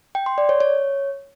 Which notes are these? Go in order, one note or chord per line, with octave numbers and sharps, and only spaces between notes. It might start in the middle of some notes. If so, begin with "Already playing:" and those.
G5
C6
D5
C#5
C#5